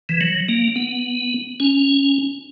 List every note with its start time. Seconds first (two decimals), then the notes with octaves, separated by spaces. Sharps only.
0.09 E3
0.21 F#3
0.49 A#3
0.76 B3
1.60 C#4